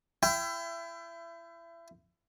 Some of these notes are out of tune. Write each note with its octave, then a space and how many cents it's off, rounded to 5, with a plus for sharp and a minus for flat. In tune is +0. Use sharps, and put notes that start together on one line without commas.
E4 +30 G5 +0